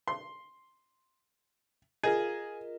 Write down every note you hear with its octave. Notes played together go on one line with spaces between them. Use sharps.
C6
F4 G#4 A#4 D#5